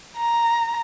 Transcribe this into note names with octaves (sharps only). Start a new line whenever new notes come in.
A#5